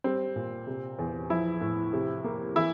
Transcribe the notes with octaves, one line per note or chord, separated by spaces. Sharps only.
G3 C4
A#2
C3
E2
F3 E4
A2
C3
A#3
E3 E4